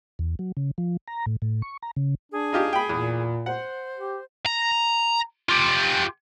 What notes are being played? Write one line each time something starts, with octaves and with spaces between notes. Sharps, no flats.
E2
F#3
C#3
F3
A#5
A2
A2
C#6
A#5
C#3
D4 G#4
D#4 F4 G4
G5 B5
E2 A#2
C5 F#5
G4
A#5
F4 G4